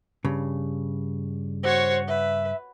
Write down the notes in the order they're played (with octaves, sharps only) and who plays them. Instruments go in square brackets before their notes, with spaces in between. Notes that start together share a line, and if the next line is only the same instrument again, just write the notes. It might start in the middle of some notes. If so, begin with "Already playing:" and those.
[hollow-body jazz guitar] G2 C#3
[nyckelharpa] F#4 C#5 [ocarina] C5
[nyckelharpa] B4 [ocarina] E5